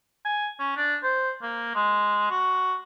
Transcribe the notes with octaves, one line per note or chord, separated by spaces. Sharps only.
G#5
C#4
D4
C5
A#3
G#3
F#4